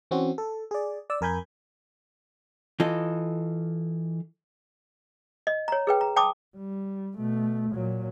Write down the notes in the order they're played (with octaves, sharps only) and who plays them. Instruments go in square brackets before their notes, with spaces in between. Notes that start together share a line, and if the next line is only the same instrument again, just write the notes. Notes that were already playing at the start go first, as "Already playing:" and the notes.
[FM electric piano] E3 C4 C#4 F#4
A4
G#4 D5
D5 E6
F2 A#4 G#5 B5 G6 G#6
[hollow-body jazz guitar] E3 F4 A4 D#5
[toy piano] D#5
C#5 A#5
G#4 B4 G5
A#5
G5 A5 B5 D6 D#6
[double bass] G3
B2 A3
A#2 F#3